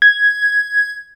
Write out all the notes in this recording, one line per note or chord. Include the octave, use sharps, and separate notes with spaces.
G#6